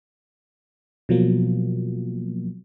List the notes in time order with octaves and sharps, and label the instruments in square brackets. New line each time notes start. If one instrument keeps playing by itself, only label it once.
[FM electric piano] B2 F3 F#3 A#3